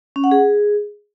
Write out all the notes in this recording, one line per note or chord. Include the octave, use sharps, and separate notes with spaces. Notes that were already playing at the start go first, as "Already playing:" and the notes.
C#4
F#5
G#4